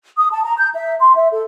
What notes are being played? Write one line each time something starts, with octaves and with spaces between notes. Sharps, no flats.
D#6
A5
A#5
G6
E5
C6
E5
A4